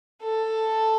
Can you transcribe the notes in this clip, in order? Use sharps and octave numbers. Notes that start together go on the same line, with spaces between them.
A4